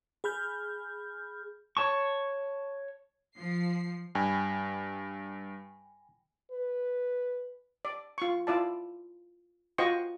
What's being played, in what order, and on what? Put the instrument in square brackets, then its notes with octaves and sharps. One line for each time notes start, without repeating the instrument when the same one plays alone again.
[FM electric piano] G#4 B5 F6 G6
[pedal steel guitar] C#5 A5 C#6
[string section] F3 C7
[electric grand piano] G2 [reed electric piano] G5 G#5 B5
[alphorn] B4
[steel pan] D5
F4 C#6
E4 F4 D5 A5
F4 F#4 C5 D#5 G5 C#6